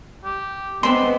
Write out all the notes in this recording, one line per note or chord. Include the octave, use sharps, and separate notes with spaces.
G4
G#3 B3 C4 D4 E5 C6